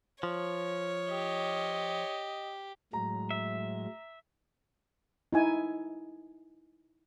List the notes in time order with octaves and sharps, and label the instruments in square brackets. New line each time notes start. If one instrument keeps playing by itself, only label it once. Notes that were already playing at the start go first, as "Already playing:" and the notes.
[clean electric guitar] F3 [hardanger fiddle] C#5
[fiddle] G4 [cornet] D#5
[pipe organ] A2 F#3 G#3 [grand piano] A#5
[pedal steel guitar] E5
[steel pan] D#4 E4 G#5